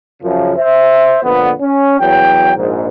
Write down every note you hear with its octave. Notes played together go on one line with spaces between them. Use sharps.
F#2 C#3 F3
C5 E5
F2 A#2 D3 B3
C#4
E2 F#3 G5
A#1 G#2